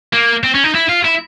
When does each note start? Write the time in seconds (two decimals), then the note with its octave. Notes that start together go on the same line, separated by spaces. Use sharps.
0.13 A#3
0.44 C4
0.55 C#4
0.64 D#4
0.75 E4
0.89 F4
1.05 E4